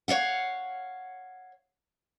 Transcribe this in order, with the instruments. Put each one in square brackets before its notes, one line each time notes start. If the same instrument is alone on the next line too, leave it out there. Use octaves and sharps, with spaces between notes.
[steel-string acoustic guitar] C#5 D5 F5 F#5